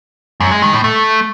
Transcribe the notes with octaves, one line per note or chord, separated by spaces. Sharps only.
F#2
G#3
D#3
A2
A3